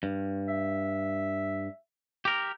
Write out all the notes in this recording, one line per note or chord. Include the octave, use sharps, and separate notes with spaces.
G2
E5
G4 A#4